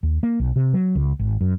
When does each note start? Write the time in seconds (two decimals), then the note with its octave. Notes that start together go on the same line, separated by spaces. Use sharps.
0.03 D#2
0.23 A#3
0.40 B1
0.56 C3
0.74 F#3
0.95 C#2
1.19 G#1
1.41 F#2